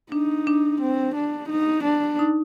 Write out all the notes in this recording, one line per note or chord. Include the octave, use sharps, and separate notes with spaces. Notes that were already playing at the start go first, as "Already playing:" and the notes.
D4 D#4
D4
C4
D4
D#4
D4
D#4